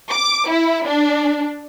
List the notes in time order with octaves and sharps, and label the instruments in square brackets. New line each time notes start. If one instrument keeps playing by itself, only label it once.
[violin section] D6
E4
D4